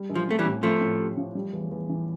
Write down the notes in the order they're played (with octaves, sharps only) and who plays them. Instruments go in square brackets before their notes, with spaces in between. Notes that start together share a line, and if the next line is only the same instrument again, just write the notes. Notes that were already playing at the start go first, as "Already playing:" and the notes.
Already playing: [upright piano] G3
A#1
[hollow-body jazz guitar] F3
[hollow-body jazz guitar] A3 [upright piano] C4
[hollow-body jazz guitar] E3 G3
[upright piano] A2
[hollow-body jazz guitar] F3 A3 [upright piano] C4
[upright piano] A2
G4
F3
G3
E2
E2
E3